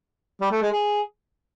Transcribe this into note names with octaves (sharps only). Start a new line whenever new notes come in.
G3
A3
G#3
G#4